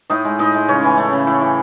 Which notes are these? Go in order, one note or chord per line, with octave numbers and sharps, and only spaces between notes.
A2 D#4 D#5
G#3
A2 D#4 D#5
G#3
C#3 C#4 C#5
E3
A3
C#3
A2
E3